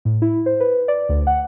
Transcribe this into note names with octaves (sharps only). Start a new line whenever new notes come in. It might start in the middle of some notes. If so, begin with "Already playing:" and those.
A2
E4
C5
B4
D5
D2
F#5